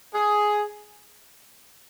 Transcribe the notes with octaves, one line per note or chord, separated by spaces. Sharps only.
G#4